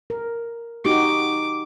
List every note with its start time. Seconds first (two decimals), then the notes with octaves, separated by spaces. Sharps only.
0.10 A#4
0.85 D#4 F#4 G4 D6